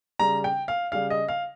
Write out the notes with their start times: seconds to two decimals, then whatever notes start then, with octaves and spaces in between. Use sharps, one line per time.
0.19 C#3 G3 A#5
0.44 G5
0.68 F5
0.92 C#3 G3 F5
1.10 D#5
1.28 F5